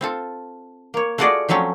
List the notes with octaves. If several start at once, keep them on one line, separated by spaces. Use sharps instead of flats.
C4 F4 A4
A#3 C#5
A3 F4 F#4 G#4 D5 D#5
F3 F#3 A3 C4 C#4